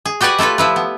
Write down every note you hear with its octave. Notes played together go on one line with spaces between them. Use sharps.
G#4
F#4 G4 B4 D5 F#5 G#5
A3 E4 F4 A4 B4
F3 E4 B4
B3